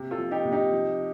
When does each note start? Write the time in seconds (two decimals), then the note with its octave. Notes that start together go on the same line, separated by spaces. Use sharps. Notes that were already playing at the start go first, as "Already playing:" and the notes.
Already playing: C3
0.11 F4 A4
0.18 F3
0.31 D#4 G4
0.45 C3
0.52 D#4 G4
0.72 F3